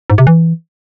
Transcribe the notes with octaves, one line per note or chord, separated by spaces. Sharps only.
G#2
C3
E3